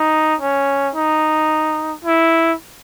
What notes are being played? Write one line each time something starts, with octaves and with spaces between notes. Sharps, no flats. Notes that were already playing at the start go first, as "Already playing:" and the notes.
Already playing: D#4
C#4
D#4
E4